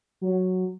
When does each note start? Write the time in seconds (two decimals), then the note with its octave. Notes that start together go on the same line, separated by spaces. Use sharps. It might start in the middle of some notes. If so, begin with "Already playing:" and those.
0.21 F#3